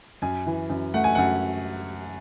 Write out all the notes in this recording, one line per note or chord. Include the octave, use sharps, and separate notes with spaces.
F#2 G#5
E3
F#2
A3 F#5
G#5
F#2 F#5